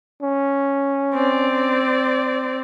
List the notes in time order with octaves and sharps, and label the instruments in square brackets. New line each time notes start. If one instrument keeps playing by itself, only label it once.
[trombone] C#4
[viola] C4 D5